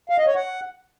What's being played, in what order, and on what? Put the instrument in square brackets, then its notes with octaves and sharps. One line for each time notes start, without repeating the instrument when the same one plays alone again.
[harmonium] F5
D#5
C#5
F#5